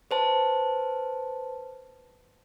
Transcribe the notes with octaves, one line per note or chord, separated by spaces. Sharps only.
B4 C5 A5